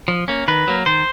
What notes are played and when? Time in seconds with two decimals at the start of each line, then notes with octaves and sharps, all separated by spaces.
0.08 F3
0.28 A#3 C#4
0.48 D#3 B4
0.67 F#3 A#3
0.86 D#3 C5